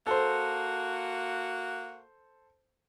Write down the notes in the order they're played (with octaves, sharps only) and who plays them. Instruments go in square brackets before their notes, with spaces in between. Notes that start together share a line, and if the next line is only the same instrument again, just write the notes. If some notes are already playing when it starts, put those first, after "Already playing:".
[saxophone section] A#3 F#4 [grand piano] A4 C5